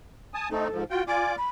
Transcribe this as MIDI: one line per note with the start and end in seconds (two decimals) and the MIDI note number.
0.34 0.49 80
0.34 0.49 81
0.34 0.49 87
0.51 0.68 57
0.51 0.68 60
0.51 0.68 63
0.51 0.83 69
0.72 0.84 44
0.72 0.84 53
0.90 1.04 65
0.90 1.02 66
0.90 1.04 79
1.08 1.36 65
1.08 1.36 74
1.08 1.32 80
1.08 1.36 86
1.38 1.49 83